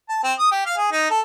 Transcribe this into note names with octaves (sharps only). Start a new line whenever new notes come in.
A5
C4
D#6
G4
F5
G#4
D#4
A4